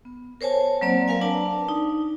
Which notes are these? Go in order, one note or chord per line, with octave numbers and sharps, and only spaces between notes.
B3
A#4 C5 C#5 G#5 A5
F#3 A#3 C4 C5 D5
A#4 B4 F5 G#5
D4 D5 A5
D#4